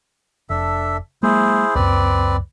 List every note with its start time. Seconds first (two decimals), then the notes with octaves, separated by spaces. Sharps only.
0.50 F1 D4 A4 E5
1.23 F#3 G#3 A#3 E4 G#4 C5
1.75 C#2 F#2 C4 B4 D5